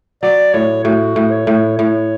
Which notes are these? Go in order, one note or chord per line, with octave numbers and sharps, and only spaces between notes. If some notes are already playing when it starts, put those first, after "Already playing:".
F#3 D5
A2 C#5
A2 F#4
A2
C#5
A2
A2 C#5